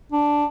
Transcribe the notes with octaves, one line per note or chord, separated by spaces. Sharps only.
D4